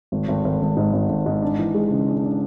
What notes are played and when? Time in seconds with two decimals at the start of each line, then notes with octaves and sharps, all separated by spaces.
0.12 G#1
0.28 G#1
0.45 G#1
0.61 G#1
0.77 G#2
0.93 G#1
1.09 G#1
1.26 G#2
1.42 D4
1.59 E3
1.74 G#3
1.91 C#3
2.08 D4
2.23 D4